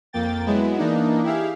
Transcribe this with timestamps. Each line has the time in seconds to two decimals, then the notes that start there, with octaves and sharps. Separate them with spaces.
0.13 F2 A#3 G5 A6
0.46 F#3 G#3 B3 E4
0.78 E3 A#3 D4 D#4
1.23 E4 G4 G#4 E5 F5